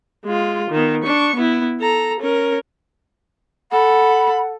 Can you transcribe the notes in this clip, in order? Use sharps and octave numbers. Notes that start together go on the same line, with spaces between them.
G#3 F4
D#3 B3
D4 C#6
B3 E4
A4 A#5
C#4 A#4
A4 F#5 B5